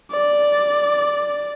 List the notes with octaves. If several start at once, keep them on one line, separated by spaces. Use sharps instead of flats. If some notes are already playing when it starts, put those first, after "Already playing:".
D5